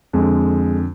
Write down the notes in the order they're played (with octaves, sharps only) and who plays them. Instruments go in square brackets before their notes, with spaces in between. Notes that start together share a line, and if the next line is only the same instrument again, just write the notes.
[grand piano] F2 D3 G#3